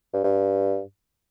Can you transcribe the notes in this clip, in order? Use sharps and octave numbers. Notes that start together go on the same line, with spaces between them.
G2
G2